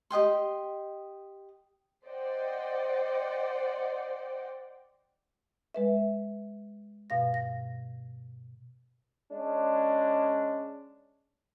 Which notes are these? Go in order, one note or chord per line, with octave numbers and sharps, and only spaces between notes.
G4 D#5 G5 C6
C5 D5 D#5 F#5 G5
G#3 B4 E5
G2 B2 F5 A#6
A#6
G#3 C#4 D4